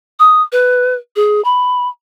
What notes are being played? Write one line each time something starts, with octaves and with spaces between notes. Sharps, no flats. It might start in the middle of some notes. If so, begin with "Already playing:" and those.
D#6
B4
G#4
B5